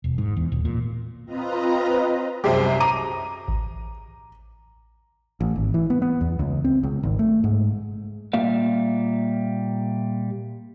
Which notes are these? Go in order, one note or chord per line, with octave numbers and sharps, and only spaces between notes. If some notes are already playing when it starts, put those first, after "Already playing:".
E1
G#2
E2
D#1
A#2
C4 F4 B4 D#5 A#5
C2 F#2 G#3 G4 C5
A#5 D6 D#7
A1
A1
G#1
E3
B3
B3
E2
C#2
C4
C#2
G#1
A3
G#2
A#2 G3 A#3 E5 F5